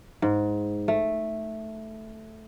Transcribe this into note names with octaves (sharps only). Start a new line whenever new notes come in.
G#2
A3